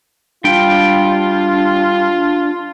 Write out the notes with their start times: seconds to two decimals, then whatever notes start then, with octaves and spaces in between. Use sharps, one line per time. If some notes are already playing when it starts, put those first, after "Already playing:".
0.44 G3 D4 F4 G5